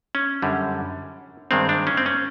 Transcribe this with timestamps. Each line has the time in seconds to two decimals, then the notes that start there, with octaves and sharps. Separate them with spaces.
0.15 C#4
0.42 F#2 D3 G3
1.51 G2 D#3 G#3 C4
1.69 D4
1.87 C#4
1.97 C4
2.06 C#4